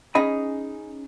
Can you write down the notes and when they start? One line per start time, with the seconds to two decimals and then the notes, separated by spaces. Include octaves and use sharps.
0.15 C#4 D#4 G#4 D#5 B5